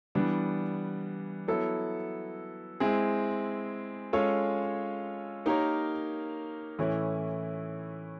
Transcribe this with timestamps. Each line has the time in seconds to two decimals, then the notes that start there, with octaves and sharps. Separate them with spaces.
0.15 E3 G3 B3 D4
1.48 F#3 B3 E4 A4
2.80 G#3 C4 E4 G#4
4.13 G#3 C#4 F4 A4 C#5
5.46 A#3 D#4 G4 A#4 C#5
6.79 A2 E3 A3 C#4 E4